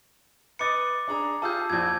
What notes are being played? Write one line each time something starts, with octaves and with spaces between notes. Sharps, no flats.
B4 D#5 D6 A6 C#7
D4 G#4 A#5
F4 G4 G#4 A5 E6 G6
A#1 F2 G#6